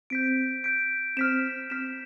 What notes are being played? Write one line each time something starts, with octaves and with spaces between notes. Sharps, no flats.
C4 G6 B6 D7
G6 B6 D7
C4 F6 B6 E7
C4 F6 B6 E7